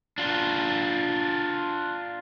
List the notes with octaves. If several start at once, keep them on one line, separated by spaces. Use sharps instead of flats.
D4 F4